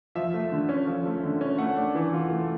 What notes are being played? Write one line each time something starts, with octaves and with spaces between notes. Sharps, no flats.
F3 E5
A3
D3
C#4
F3
A3
D3
C#4
A3 F#5
D4
E3
F4
A3